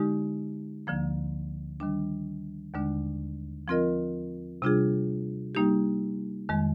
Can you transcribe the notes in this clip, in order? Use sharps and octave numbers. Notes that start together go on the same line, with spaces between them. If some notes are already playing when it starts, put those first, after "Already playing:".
Already playing: D3 G#3 D#4 G4
D2 D3 F3 A#3
D#3 G3 D4
D#2 D3 G#3 D4
F3 C4 F4 A#4 D#5
C3 G3 D4 F4 G#4
G3 A#3 D#4 G4
F2 D#3 G#3